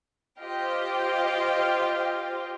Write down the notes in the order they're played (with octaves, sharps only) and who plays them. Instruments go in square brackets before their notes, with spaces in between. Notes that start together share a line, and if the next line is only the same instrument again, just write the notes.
[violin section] F4 G4 C5 D#5 F5 G5